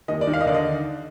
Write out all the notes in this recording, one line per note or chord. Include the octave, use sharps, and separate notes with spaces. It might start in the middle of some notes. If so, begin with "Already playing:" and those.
D#2 D#5
D5
D#3
F5
D#5
D3 D5
D#5